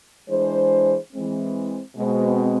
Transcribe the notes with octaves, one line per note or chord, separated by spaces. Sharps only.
E3 G#3 D4 G#4 C5
E3 G#3 C4
B2 G#3 C4